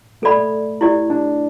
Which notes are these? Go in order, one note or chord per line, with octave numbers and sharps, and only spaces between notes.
A3 A4 D5 B5
A3
E4 G4 D5
D4